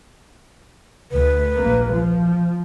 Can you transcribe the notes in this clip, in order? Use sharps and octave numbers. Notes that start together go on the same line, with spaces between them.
D2 B4
A#1 A#3
F3